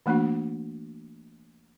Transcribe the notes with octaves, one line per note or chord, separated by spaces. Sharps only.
E3 A3 A#3 D4 F#4